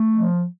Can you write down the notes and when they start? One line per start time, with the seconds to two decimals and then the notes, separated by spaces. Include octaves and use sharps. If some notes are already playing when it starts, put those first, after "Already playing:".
Already playing: A3
0.14 F3